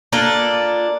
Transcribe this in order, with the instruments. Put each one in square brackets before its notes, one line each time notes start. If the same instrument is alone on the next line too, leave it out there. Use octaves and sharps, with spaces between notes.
[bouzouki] A#3 D4 F4 A4